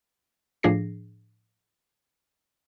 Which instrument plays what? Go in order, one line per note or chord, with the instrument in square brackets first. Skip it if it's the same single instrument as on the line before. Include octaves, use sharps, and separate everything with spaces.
[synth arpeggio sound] A2 F3 D4 G#4 A#6 C7